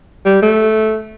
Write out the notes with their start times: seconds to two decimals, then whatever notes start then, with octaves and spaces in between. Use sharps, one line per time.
0.25 G3
0.42 A3